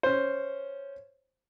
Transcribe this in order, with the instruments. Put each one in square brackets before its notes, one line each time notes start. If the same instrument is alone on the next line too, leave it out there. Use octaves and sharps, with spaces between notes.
[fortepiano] C#4 C5